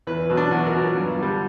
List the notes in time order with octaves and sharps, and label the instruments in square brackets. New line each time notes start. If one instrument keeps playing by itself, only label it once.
[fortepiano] E2 B4
B2 F#3
D4
E2 F#4
A#4
B2 F#3
G2
D3 G3